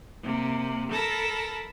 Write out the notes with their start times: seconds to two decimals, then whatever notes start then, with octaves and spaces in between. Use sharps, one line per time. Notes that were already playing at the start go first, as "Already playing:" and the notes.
0.22 C3 A#3
0.91 A4 A#4 A5 B5 A#6